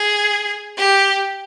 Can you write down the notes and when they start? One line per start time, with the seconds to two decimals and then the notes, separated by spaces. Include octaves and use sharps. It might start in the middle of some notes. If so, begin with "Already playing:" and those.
Already playing: G#4
0.78 G4